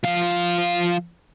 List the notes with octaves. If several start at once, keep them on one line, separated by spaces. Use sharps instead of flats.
F3 F5